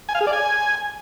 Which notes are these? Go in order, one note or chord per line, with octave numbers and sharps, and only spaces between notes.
G#5
F5
G#4
D5
G#5